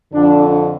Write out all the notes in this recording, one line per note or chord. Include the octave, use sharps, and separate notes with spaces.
F2 D3 D4